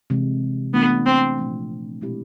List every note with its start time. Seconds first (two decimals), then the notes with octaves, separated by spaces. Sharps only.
0.10 C3 E3 G#3
0.74 C3 E3 A3 B3 D4 F4
1.06 C4
1.38 A#2 F3 A3 C4
2.01 B2 G#3 C4 E4 G4